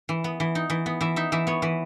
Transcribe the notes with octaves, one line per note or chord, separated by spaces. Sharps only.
E3
B3
E3
D#4
E3
B3
E3 E5
D#4 E5
E3 E5
B3 C#5
E3 B4